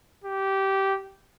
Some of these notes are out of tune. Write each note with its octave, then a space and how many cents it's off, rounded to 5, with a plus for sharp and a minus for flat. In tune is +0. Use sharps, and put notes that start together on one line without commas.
G4 -15